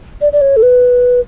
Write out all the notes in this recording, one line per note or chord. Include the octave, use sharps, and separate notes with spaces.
D5
D5
C#5
A4
B4